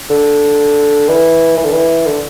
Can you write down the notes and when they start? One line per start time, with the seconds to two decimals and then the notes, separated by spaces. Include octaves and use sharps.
0.10 D3
1.09 E3
1.58 E3
1.64 D3
1.73 E3
2.06 D3